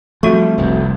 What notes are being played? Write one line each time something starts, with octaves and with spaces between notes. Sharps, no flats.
F3 G3 A3 C4 F#4 C#6
F1 C2 F2